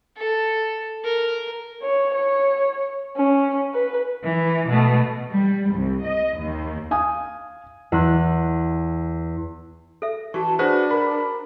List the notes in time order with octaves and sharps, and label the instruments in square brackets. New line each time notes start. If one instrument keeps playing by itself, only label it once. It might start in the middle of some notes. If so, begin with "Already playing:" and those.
[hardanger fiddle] A4
A#4
[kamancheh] C#5
C#5
C#4
B4
[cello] E3
B2 A3
[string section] G3
C2
D#5
D#2
[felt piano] F5 G#5 D#6
[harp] E2 F#6
[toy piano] A4 E5
[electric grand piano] E3 [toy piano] F#4 C#6 [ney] A5
[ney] D4 [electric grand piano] F#4 G#4 B4 [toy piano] C5
[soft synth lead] A#4 [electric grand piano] B5